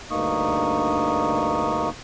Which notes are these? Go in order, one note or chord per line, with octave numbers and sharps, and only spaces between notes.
D2 G2 A#3 D#4 C#6 D#6